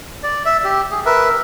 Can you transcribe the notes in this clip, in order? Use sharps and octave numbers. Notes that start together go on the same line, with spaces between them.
D5
E5
G4
G#4
A#4 B4 E5